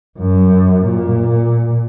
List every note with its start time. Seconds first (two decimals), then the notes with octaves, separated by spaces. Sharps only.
0.18 F#2
0.85 A#2